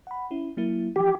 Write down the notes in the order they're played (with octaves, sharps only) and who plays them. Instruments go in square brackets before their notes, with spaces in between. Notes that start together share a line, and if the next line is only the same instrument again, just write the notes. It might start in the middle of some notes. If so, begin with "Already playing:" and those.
[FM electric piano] F#5 B5
C#4 E4
F#3 A#3 E4
[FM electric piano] E3 F3 [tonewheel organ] G4